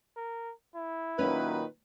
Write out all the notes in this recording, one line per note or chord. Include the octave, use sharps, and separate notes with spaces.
A#4
E4
A#2 D#3 F#3 C#4 B4